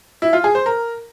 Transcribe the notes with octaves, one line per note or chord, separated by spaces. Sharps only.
E4
F4
G#4
C5
A#4